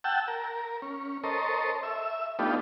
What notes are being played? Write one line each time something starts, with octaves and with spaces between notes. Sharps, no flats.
F#5 G5 A5 E6
A#4
C#4
A4 A#4 C5 C#5 D#5
E5
A3 B3 D4 D#4 F4 G4